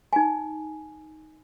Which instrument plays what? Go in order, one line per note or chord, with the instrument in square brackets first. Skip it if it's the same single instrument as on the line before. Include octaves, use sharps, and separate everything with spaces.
[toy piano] D#4 G#5